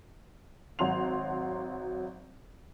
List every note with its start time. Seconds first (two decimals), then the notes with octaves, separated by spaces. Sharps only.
0.79 G#1 F#3 F#4 C6 F7